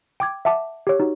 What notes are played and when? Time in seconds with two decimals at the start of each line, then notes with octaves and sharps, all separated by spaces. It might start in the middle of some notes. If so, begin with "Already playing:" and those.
0.20 G5 D6 G#6
0.45 E5 F#5 A5 D6
0.87 G4 C#5
1.00 D#4 F#4